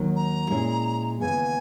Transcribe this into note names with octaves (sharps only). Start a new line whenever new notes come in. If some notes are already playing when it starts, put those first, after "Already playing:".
Already playing: D#2 D#3 F#3
A#5
A#2 G#3 C#4 E4 G#4
D#2 C#3 E3 G#3 B3 G#5